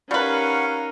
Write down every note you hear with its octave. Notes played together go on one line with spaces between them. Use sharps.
G3 C#4 D#4 A#4 B4 F5 F#5 C#6